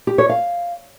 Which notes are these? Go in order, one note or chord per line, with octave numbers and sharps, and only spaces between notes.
G4
C#5
F5